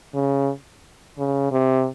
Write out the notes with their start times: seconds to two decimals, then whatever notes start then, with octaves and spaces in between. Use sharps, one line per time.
0.14 C#3
1.18 C#3
1.52 C3